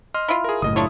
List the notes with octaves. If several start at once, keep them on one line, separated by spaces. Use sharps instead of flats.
D#5 C6 F6
E4 F4
G#4 A#4
F#1 A2 D#5 D#6
D4 E4 F4 C#5